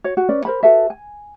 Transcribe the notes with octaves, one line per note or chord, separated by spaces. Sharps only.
F#4 C#5
F#4
C#4 B4 D5
A#4 C5 B5
F#4 A4 B4 E5
G#5